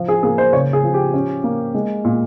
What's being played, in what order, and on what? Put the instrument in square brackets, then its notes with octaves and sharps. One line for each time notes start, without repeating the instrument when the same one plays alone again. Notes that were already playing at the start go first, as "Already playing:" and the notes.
Already playing: [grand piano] F3
G#4
A#3 G#4
C5
C#3 C#5
G#4
F3
G4
C#4
A#3
G#3
A#2